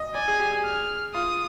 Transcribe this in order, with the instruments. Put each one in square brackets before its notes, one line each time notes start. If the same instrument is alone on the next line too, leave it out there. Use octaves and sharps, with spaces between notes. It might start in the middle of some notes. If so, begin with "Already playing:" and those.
Already playing: [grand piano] D#5
[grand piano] D5 [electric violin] G#5
[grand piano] G#4
G4
G#4
[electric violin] F6
[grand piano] F4 [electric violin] D#6